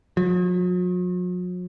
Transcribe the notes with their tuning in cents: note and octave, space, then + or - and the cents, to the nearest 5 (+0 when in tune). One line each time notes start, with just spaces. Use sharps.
F#3 -45